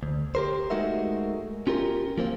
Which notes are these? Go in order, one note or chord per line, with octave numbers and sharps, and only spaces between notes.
D2
G4 A#4 C5
G#3 A3 D#4 F#4 A#4 E5
C#4 F4 G4 A#4
F3 A#3 C4 F4